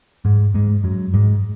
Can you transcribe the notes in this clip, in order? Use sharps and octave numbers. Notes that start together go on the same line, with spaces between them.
G#2 G#3
G#2 G#3
F#2 F#3
G#2 G#3